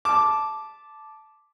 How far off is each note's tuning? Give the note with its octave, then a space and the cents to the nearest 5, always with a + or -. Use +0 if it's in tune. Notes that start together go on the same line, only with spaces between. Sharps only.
A5 -10 D6 +0